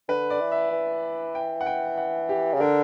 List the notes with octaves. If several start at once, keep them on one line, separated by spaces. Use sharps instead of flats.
D3 B4
D5
E3
E5
E3
G5
F#5
G5
F#5
G4
C#3
D3 A#4